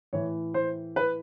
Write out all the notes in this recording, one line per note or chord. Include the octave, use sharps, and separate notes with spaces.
A2 E3 C#5
C5
B4